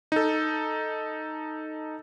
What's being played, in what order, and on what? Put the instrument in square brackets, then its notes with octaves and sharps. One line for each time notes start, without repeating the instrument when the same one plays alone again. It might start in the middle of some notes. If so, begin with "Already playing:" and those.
[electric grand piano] D#4 A4